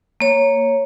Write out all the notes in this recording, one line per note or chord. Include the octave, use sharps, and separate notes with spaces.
A#3 C#5